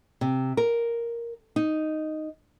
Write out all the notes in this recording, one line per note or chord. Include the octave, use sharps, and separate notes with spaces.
C3
A#4
D#4